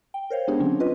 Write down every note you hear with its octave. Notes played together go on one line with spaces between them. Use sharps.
G5
A#4 C5 C#5 F5
G#3 B3 D4 G4 G#4
D3 F#3 C4 C#4
F4 B4 D#5